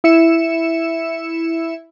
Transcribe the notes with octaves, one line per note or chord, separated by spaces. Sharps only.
E4 E5 C#7 E7